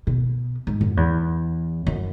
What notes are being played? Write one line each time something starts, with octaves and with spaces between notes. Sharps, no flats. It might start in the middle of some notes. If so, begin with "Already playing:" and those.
B2
G#2
F#2
E2
F#2